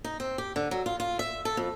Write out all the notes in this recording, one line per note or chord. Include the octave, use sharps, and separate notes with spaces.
D#4
C4
G4
D3
F#3
F4
F4
E5
A4
F2